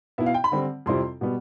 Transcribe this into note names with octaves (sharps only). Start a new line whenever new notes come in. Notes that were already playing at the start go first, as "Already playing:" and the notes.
B2 B3 E4 E5
F5
G5
B5
D3 G3 C4
F2 C3 G3 C4 E4 C6
B2 G3 B3